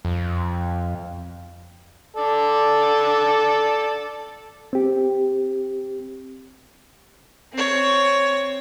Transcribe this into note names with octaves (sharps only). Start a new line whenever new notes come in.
F2
A4 D5
C4 G4
C4 C#5